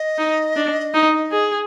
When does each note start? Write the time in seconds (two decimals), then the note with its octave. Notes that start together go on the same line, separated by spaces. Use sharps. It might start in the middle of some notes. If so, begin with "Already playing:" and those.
Already playing: D#5
0.18 D#4
0.56 D4
0.94 D#4
1.32 G#4